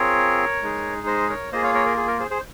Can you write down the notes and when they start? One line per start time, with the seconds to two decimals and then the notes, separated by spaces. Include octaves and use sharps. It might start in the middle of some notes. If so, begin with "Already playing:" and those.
Already playing: C4 F4 G#4 A#4 C#5
0.62 G#3 D#4 G#4
1.07 C5 D#5
1.29 A#4 C#5
1.52 A#3 F4 G#4 C5 D#5
1.64 C#5 F5
1.74 A#4 C#5
1.86 A#4
1.97 G#4
2.08 A#4
2.20 G#4 C5
2.31 G#4 C5